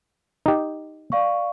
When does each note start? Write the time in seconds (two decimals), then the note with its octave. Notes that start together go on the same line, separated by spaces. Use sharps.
0.46 D#4 G4
1.12 D5 F5 C#6